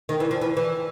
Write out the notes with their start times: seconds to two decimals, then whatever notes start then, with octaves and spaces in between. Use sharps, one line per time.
0.09 D#3
0.20 E3
0.31 F3
0.41 E3
0.57 E3